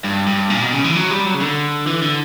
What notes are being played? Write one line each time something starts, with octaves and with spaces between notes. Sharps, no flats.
G2
G2
A#2
B2
C#3
E3
F#3
G3
F#3
C#3
D3
E3
D3